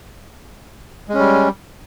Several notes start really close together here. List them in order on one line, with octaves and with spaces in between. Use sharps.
G#3 C#4 G3